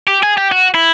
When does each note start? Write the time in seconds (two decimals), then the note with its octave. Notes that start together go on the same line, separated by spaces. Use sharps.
0.08 G4
0.23 G#4
0.38 G4
0.52 F#4
0.75 E4